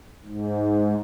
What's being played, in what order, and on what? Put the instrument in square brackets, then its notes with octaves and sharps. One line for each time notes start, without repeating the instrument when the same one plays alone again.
[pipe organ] G#2